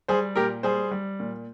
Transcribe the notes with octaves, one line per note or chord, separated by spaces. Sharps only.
G3 G#4 C5
A#2 G4 A#4
G3 G#4 C5
G3
A#2